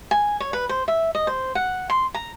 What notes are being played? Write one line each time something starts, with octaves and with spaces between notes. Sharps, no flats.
G#5
C#5
B4
C5
E5
D#5
C5
F#5
C6
A#5